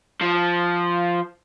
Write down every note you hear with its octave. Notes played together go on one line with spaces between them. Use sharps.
F3